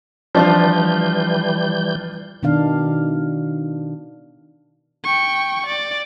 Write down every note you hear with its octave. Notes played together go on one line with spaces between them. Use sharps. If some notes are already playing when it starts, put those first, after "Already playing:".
E3 F3 G3 D4 F4 G6
B2 D#3 D4 F5
G5 C#6
D5